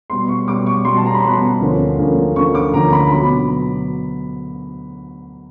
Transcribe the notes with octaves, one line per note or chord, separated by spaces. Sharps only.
B2 G3 B3 C6
C#6
B2 G3 B3 D6
C#6
B2 G3 B3 C6
A5
A#5
B5
B2 G3 B3 C6
D2 D3 F3 A#3 C#4
D2 D3 F3 A#3 C#4
D2 D3 F3 A#3 C#4 C#6
D6
D2 D3 F3 A#3 C#4 A#5
B5
B2 F#3 B3 B5